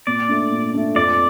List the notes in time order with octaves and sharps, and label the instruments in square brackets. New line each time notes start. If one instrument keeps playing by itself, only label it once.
[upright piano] A#2 [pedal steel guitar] D5
[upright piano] A3 D4
A#2
A3 D4
[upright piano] F2 [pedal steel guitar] D5